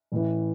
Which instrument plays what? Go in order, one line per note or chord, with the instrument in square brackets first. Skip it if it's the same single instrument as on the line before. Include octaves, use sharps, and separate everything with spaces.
[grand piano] A1 A2 E3